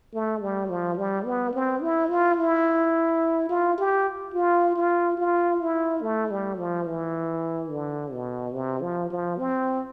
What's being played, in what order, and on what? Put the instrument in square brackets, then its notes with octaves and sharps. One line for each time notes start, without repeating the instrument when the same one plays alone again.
[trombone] A3
G3
F3
G3
B3
C4
E4
F4
E4
F4
G4
F4
F4
F4
E4
A3
G3
F3
E3
D3
B2
C3
F3
F3
C4